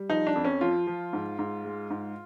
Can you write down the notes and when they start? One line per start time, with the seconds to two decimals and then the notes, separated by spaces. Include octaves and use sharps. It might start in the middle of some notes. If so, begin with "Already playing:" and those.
Already playing: G3
0.10 F3 D#4
0.27 D4
0.36 F2
0.45 C#4
0.61 F3 F4
0.87 F3
1.13 G#2
1.39 G#2
1.64 G#3
1.90 G#2